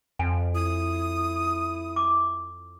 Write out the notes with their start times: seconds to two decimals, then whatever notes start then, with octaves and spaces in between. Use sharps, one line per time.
0.19 F2 G#5
0.55 E4 D#6
1.96 D6